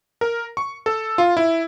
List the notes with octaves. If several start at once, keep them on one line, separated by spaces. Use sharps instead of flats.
A#4
C#6
A4
F4
E4